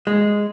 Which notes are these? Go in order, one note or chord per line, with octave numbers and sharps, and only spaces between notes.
G#3